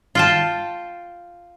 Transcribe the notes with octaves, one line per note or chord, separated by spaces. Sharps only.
F4 G5 A5